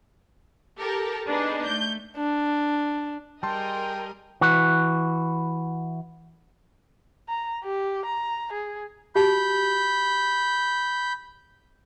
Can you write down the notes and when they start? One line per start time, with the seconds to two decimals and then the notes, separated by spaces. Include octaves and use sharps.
0.79 G4 A4 A#4
1.27 B3 D4 D#4 G#4
1.65 A3 G6
2.17 D4
3.43 G3 G#4 A#4 D#5 G5 A5 C6
4.41 E3 F#4
7.29 A#5
7.64 G4
8.05 A#5
8.52 G#4
9.15 F#4 G4 A5 B5 G6